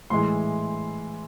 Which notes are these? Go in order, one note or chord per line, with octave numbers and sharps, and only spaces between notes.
A2 E3 G#3 C6